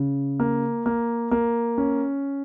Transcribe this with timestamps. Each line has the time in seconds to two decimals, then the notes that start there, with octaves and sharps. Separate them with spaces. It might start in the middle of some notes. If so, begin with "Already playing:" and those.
Already playing: C#3
0.40 A#3
0.86 A#3
1.31 A#3
1.78 C#4